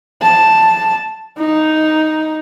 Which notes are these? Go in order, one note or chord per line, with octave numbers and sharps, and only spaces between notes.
A5
D#4